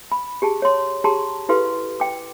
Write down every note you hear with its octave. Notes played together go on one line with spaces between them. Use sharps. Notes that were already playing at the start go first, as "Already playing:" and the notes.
B5
G4 G#4 A5
C#5 C6
G4 G#4 A5 A#5 C6
E4 G4 A4 B4 F5 C6
G5 D6